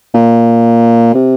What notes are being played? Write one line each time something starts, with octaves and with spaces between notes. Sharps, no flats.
A#2
C3